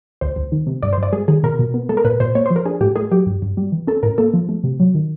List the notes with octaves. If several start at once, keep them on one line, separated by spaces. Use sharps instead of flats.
D2 C5
D2
D#3
C3
G2 D5
G2 C5
D5
G#3 G#4
D#3 G#4
B2 A#4
B2
B3
G#3 A4
A#4
A#2 B4
A#2 C5
A#3 C#5
F3 C5
A#4
D4 G#4
A2 G4
A3 G#4
F#3 G4
G2
G2
G3
E3
C#4 A4
A2 A#4
A#3 A4
F3
A3
C3
F#3
D#3